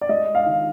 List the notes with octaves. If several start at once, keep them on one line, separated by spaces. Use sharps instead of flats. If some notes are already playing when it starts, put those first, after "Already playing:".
D5
G#3 D#5
F5
D#3